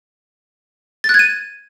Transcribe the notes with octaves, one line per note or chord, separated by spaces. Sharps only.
A6
F#6
G#6
D#7